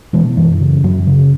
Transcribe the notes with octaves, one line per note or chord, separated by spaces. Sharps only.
B2 E3 G#3
F#2 E3
C#3
F#2 F#3
C#3